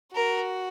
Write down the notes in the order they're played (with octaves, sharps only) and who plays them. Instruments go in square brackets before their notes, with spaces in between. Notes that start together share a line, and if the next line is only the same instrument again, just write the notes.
[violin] F#4 [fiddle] A#4